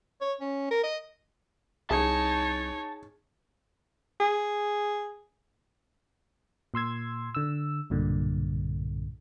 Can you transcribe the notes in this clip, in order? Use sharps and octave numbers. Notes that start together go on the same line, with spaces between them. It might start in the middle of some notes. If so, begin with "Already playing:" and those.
C#5
C#4
A#4
D#5
C2 D#4 G#4 C#5 A5
G#4
A#2 C6 E6 G#6
D3 E6
B1 G2 A#2 D3